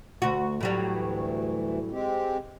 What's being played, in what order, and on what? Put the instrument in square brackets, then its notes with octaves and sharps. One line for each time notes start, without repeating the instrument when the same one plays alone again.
[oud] D2 F#4
A2 F#3 G3
[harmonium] D2 E3
G#3 C4 G4